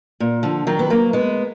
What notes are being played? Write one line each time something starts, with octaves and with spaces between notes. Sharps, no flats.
A#2
D3 F3
D#3 F#3
B3
F#3 A#3
G#3 B3